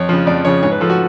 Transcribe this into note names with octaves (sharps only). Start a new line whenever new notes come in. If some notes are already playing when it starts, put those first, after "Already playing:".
Already playing: F2 C#5
C#3 F3
F2 D5
C#3 F3 C#5
G#2 C#5
B4
F3 A4
F#4